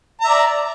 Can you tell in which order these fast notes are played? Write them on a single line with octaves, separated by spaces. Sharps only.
A#5 E5 D5